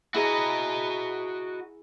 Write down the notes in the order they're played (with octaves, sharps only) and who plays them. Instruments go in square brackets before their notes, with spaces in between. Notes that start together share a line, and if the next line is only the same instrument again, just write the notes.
[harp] E4 G#4 A#5 [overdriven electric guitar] F#4 D#5